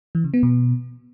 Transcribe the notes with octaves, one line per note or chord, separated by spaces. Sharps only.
E3
C#3
B3
B2